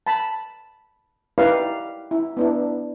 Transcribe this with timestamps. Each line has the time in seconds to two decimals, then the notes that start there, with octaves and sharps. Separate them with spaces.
0.07 A5 B5
1.38 D#4 E4 G4 B4 D5 F5
2.11 E4
2.37 B3 D4 E4